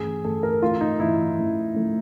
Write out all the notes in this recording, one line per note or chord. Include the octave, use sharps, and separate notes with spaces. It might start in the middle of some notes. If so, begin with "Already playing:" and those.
Already playing: G2 E3 A3 C#4 G#4
G2 E3 A3 C#4 A4
A#4
G2 E3 A3 C#4 F4
D#4
G2 E3 A3 C#4 E4
F3 A3 C#4
F3 A3 C#4